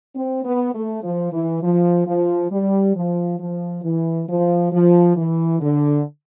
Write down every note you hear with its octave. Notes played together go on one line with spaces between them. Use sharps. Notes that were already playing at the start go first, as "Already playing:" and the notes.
C4
B3
A3
F3
E3
F3
F3
G3
F3
F3
E3
F3
F3
E3
D3